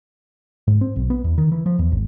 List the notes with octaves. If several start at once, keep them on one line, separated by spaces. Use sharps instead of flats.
G#2
C4
B1
B3
E2
D#3
E3
F3
E2
G#1